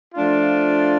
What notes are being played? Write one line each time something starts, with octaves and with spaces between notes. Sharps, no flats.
F3 A3 D4 F4